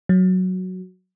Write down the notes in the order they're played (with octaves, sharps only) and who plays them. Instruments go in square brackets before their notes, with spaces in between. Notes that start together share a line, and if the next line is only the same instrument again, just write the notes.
[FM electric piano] F#3